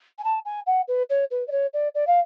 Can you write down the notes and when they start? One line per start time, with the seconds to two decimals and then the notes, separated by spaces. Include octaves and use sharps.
0.19 G#5
0.24 A5
0.45 G#5
0.67 F#5
0.88 B4
1.10 C#5
1.31 B4
1.48 D5
1.52 C#5
1.74 D5
1.95 D5
2.07 F5